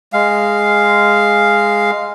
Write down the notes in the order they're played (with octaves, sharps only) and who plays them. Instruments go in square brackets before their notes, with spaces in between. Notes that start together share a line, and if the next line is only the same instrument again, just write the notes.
[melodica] G#3 F5